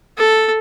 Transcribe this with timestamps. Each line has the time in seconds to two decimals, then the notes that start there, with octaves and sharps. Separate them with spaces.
0.18 A4